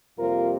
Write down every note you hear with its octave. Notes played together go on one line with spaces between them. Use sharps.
F2 C3 G3 A#3 F4 A#4